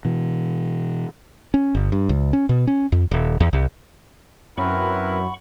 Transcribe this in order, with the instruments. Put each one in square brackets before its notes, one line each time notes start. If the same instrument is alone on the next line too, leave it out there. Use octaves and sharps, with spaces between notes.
[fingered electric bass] B2 E3
C#4
G1
G2
C#2
C#4
B2
C#4
F2
D#1
E2
C2
[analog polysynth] F#2 [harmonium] C4 A#4 B4 [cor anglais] E4 [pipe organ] F#5 B5 C#6